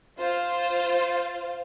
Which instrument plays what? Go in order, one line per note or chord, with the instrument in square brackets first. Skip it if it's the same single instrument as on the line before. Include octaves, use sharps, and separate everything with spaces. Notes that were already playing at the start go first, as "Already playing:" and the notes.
[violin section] F4 C5 F5